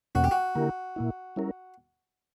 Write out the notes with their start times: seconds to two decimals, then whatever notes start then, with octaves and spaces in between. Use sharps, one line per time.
0.15 E2 B2 A#3 C#4 F#4
0.24 G4
0.31 F#4
0.55 D3 A#3 E4 G4 A#4
0.96 A#2 A#3 E4
1.36 G3 C#4 E4 A#4